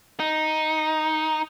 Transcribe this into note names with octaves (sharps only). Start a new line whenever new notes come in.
D#4